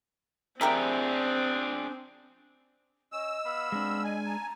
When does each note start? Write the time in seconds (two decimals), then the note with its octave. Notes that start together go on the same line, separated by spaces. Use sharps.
0.61 C4 D4 G4 G#4 A#4 E5
3.12 C#4 D#5 E6
3.45 B3 F5 B5
3.72 G#3 C4 D4
4.04 D#5 G#5
4.25 A5 A#5